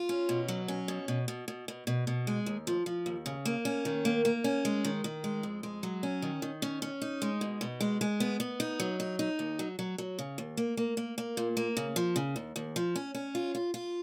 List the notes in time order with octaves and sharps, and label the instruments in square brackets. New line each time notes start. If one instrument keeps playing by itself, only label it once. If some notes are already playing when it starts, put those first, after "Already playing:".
Already playing: [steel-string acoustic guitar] F4
C#4
B2
F#3
C#4
B2
B2
B2
B2
B2
B2
B2
G#3
D#2
F3
F3
D#2
C#3
A#3
C#4
D#3
A#3
A#3
C#4
G#3
D#3
D#3
G#3
F2
G#3
F#3
C#4
D#3
D#3
C#4
C#4
D#4
G#3
B2
B2
G#3
G#3
B3
B3
D#4
F#3
D#4
D#4
D#2
F#3
F#3
F#3
C#3
D#2
A#3
A#3
A#3
A#3
A#2
A#3
C#3
F3
C#3
D#2
D#2
F3
C#4
C#4
F4
F4
F4